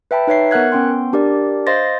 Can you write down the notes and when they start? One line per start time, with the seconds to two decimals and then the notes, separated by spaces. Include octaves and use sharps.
0.11 B4 E5 G5 A5 B5
0.27 D#4 B4 C#5 E5 C7
0.51 B3 A#4 F#5 F#6 G#6
0.72 B3 C#4 G5 C6
1.13 D4 G4 A#4 D5
1.67 C5 D#5 F5 C6 A6 A#6